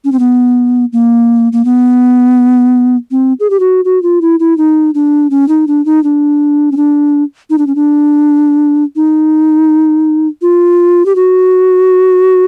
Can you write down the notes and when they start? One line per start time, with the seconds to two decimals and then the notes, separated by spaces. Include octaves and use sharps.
0.05 C#4
0.12 C4
0.19 B3
0.93 A#3
1.53 A#3
1.65 B3
3.11 C4
3.40 G#4
3.50 G4
3.60 F#4
3.85 F#4
4.03 F4
4.22 E4
4.40 E4
4.58 D#4
4.94 D4
5.31 C#4
5.49 D#4
5.67 D4
5.85 D#4
6.04 D4
6.72 C#4
6.77 D4
7.50 D#4
7.58 D4
7.67 C#4
7.75 D4
8.96 D#4
10.42 F4
11.06 G4
11.16 F#4